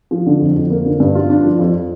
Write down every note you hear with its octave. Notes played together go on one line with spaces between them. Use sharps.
F3
D3
F2
F2
A#3
D3
G2
F4
D4
F3
F2